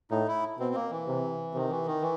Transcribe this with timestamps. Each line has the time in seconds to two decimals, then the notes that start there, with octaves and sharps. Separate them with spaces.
0.11 A2 D#4
0.28 E4
0.59 B2 C4
0.74 A#3
0.91 E3
1.07 C3
1.54 C3 D#3
1.70 E3
1.86 D#3
2.02 E3